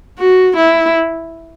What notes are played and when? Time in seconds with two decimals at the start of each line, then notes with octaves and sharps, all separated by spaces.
0.19 F#4
0.56 E4